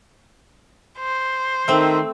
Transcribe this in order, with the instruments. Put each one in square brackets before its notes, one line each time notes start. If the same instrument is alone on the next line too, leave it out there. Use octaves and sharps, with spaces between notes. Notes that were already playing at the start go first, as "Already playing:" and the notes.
[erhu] C5
[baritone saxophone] D#3 [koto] A3 C4